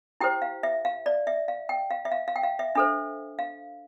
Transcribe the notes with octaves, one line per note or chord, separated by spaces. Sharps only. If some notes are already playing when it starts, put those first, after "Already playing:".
E4 G4 C5 G5
F5
E5
F5
D5
E5
F5
G5
F5
E5
F5
F5
G5
F5
E5
D4 A4 C5 E5
F5